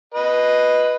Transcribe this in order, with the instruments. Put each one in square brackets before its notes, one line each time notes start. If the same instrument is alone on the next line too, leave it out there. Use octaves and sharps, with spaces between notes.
[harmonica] B4 D#5